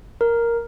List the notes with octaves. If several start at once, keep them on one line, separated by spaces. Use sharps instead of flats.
A#4